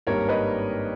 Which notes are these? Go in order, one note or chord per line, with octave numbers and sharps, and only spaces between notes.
G#1 G2 G3 A#3 A#4 C#5
B4 D#5